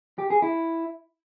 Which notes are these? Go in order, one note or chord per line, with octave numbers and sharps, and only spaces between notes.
G4
G#4
E4